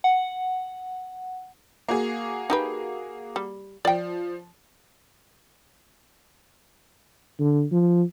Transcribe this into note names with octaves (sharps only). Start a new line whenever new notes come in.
F#5
A#3 F#4 G#4
D#4 G4 B4
G3
F3 D5 G5
D3
F3